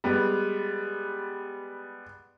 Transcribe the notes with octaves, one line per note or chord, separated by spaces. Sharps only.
G3 G#3 B3